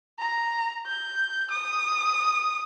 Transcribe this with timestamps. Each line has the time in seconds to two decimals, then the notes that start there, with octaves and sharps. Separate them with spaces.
0.19 A#5
0.87 G6
1.50 D#6